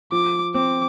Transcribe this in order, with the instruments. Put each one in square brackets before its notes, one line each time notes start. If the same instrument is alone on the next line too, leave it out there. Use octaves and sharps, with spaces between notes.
[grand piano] F3 [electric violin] D6
[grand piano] C4 [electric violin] D6